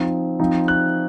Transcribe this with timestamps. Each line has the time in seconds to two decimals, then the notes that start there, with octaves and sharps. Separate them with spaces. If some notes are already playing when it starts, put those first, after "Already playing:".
Already playing: F3 C4 D#4
0.40 F3 C4 D#4
0.68 F#6